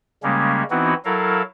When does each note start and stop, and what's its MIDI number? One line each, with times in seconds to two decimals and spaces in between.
0.23 0.63 49
0.23 0.63 55
0.23 0.63 56
0.23 0.63 58
0.23 0.63 61
0.71 0.94 52
0.71 0.94 59
0.71 0.94 60
0.71 0.94 63
0.71 0.94 64
0.71 0.94 66
1.05 1.42 54
1.05 1.42 64
1.05 1.42 69
1.05 1.42 70
1.05 1.42 77